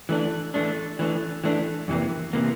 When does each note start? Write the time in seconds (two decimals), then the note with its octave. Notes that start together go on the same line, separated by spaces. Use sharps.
0.09 E3 A3 D4
0.54 E3 A3 D4
0.99 E3 A3 D4
1.44 E3 A3 D4
1.88 F2 C3 E3 A#3
2.33 C3 E3 A#3